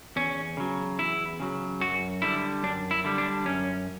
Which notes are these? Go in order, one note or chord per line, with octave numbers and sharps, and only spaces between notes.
E2 C#4
C#3 F#3
E2 E4
C#3 F#3
F#2 F#4
D3 G3 E4
F#2 D4
E4
D3 G3
D4
F#2 C#4